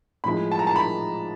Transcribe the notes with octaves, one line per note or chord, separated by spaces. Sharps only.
A2 F3 G#3 B5
A5
A#5
A5
B5